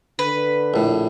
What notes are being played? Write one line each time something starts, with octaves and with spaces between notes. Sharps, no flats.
D3 B4
A#1 A2